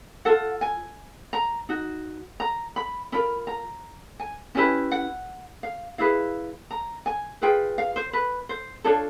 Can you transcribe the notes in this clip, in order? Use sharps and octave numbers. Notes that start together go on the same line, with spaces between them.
F4 A4 F#5
G#5
A#5
D#4 F#4
A#5
B5
C#4 F4 A#4 B5
A#5
G#5
C#4 E4 G4 B4 G#5
F#5
F5
E4 G#4 B4 F5
A#5
G#5
F4 G#4 B4 G5
F5
C5
B4
C5
D4 F4 A4 C#5